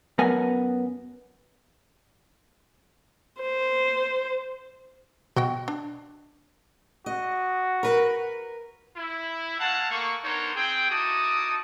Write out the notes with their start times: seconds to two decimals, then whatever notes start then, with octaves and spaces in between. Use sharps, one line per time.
0.18 F#2 F#3 B3 A#4 B4 G#5
3.41 C5
5.36 B2 F#4 D#5 G5
5.68 D4
7.06 F#4 D#5
7.83 A#4 B4
8.97 E4
9.59 G#3 A3 F5 F#5 A5
9.91 A3 A#3 C#6
10.24 B3 D4 D#4 A#4 C5 C#5
10.55 C4 G#4 G5
10.90 D#4 E4 F#4 A5 D6 D#6